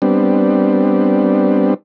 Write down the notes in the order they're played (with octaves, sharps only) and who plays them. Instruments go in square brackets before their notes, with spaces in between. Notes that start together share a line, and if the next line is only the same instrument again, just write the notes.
[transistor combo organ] G3 B3 C4 D4